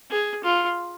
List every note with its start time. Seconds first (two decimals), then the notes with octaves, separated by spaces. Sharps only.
0.11 G#4
0.43 F4